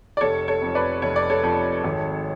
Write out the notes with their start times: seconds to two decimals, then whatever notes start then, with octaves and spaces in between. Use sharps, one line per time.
0.17 D5
0.21 F1 A4 C#5
0.48 A4 C#5
0.62 F2 F3
0.75 B4 D5
1.02 F1 C#5
1.16 D5
1.30 A4 C#5
1.43 F2 F3
1.84 G#1